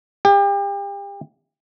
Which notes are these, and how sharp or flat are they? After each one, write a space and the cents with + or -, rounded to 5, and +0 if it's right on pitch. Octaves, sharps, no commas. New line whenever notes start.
G4 +35